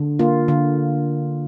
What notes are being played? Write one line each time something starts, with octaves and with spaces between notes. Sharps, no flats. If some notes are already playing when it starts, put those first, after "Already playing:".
Already playing: D3
A#3 F4
D3